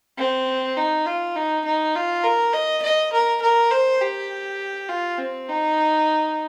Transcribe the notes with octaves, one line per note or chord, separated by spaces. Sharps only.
C4
D#4
F4
D#4
D#4
F4
A#4
D#5
D#5
A#4
A#4
C5
G4
F4
C4
D#4